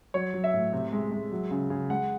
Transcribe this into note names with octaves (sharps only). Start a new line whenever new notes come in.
F#3 C#5
F#3
E5
A2
C3
G#3
G#3
F#3
C#3
C#3
G#3 F#5